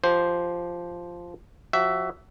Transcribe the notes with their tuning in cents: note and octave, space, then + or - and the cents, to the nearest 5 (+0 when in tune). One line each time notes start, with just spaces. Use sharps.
F3 -5 G4 +0 C5 +0
F3 +25 F#4 +30 E5 +0